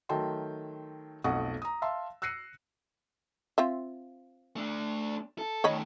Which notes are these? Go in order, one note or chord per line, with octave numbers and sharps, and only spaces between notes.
D#3 F#3 A3 G5 A5 C6
B1 F2 A3 F#5 C#6 D#6
A#5 D#6
E5 F5 A5 C6 E6
E6 F#6 A#6 C7 C#7 D#7
C4 F4 E5
A3 D4
A4
D#3 A3 C#5 D#5 B5